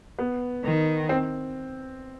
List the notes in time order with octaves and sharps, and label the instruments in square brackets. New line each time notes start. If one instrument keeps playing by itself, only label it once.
[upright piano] B3
[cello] D#3
[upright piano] C4